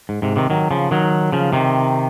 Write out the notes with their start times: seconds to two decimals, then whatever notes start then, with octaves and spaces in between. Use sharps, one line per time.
0.09 G#2
0.22 G#2 C3
0.36 C3 D#3
0.50 D#3 F#3
0.71 C#3 F3
0.91 D#3 F#3
1.32 C#3 F3
1.53 C3 D#3